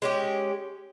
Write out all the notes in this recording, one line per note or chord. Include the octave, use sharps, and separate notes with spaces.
G#3 C#4 G4